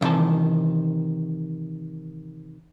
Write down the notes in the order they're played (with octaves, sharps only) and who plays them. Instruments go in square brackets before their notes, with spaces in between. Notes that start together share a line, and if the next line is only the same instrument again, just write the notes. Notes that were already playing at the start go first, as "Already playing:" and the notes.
[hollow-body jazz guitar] E2 C3 D#3 E3 A5